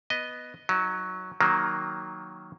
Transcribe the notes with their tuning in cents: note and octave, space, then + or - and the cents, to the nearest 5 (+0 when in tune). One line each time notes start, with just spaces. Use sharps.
B3 +0 D#5 +0
F#3 +0 D#4 +35
D#3 +0 F#3 +0 A#3 +0